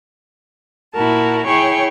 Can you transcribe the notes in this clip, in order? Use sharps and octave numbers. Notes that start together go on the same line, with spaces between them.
A#2 E4 F#4 A#4 A5
E4 G#4 C#5 G5 C#6